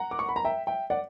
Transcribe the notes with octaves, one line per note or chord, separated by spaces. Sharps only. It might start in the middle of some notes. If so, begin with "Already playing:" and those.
Already playing: F#5 A#5
D6
C#6
B5
A#5
E5 G5
E5 G5
D5 F#5